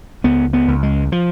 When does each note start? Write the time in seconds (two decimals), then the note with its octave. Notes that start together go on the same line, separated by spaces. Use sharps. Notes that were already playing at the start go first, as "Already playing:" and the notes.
0.24 C#2 B3
0.53 B3
0.68 C#2
0.83 G#3
1.12 F3